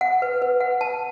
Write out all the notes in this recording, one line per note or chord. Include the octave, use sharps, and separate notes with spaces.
F#5
B4
B4
F#5
A5